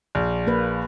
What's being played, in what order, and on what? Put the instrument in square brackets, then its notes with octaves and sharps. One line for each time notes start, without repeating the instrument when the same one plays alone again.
[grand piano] A#1
[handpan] A#3 B4